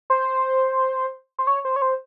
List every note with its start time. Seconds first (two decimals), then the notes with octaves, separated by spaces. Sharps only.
0.10 C5
1.39 C5
1.47 C#5
1.65 C5
1.76 C#5
1.82 C5